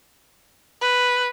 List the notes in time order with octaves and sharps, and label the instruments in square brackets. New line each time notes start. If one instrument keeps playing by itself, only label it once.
[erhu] B4